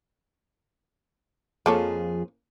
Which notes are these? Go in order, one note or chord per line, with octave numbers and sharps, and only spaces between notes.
F2 F3 A#3 G#4 A4 C#5